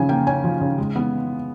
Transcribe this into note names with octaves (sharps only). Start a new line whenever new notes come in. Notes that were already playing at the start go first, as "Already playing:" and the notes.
Already playing: C#3 F3 C#4 G#5
A#3 G5
C#4 G#5
F3
C#3
G#3
B3